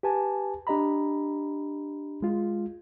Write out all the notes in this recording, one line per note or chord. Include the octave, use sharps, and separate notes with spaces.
G4 B4 G#5 A5
D4 G4 D#5 A#5 B5
G#3 F4